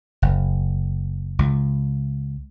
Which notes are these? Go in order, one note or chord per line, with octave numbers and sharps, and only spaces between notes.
F#1
C#2